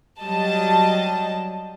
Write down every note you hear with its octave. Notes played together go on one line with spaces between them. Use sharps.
F#3 G3 D#5 A5